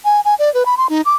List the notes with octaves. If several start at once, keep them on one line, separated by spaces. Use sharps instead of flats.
G#5
G#5
D5
B4
B5
C6
D#4
D6